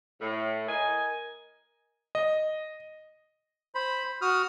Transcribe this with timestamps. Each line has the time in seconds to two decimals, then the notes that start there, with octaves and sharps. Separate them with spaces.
0.20 A2
0.68 A#4 D#5 G#5
2.15 D#5
3.75 C5 B5
4.22 F#4 D#6 F6